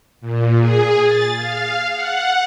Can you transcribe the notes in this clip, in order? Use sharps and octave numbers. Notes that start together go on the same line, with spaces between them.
A#2
G#4
A6
F5
F#5